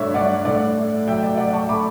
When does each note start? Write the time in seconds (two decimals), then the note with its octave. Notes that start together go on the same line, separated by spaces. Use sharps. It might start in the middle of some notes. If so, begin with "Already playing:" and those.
Already playing: G2 F#3 A3 C#5 D5 E5
0.14 G2 D5 F#5
0.45 A2 D5 F#5
0.77 A3
1.07 F#3 E5 G5
1.23 D5
1.37 F#3 D5 F#5
1.53 A5 C#6
1.68 A3 B5 D6